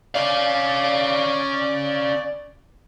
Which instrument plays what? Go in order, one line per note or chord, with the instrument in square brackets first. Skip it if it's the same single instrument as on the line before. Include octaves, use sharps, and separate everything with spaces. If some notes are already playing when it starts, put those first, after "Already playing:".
[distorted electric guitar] C#4 F5 [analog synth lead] D5